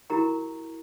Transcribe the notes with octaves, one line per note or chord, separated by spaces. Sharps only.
E4 F#4 G4 A#4 A#5 C#6